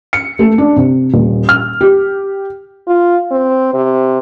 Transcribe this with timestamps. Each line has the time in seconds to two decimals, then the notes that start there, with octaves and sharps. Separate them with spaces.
0.13 C#7
0.39 A3
0.58 D4
0.76 C3
1.14 D#1
1.49 F6
1.81 G4
2.87 F4
3.31 C4
3.74 C3